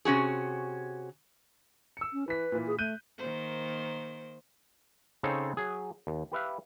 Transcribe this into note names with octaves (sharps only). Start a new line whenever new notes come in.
C3 C#4 F#4 G#4
E6 C#7
C#4
E3 B4 B6
A#2 E3
G#4
A3 F#6 G6 D#7
D#3 A#3 C5
C#3 C4 D#4 A4 C5 C#5
F#3 G#4
D#2
G4 B4 E5 F5